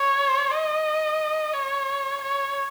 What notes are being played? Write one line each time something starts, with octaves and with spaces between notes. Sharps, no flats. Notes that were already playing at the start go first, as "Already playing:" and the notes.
Already playing: C#5
D#5
C#5
C#5